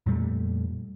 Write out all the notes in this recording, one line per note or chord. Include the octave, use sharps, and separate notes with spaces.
F2 A#2 G3 A3